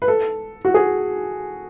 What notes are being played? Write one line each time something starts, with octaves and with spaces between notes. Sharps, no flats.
B4
A4
F#4
G#4